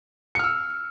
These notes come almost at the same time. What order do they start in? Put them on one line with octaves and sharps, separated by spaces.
C#7 F6 E6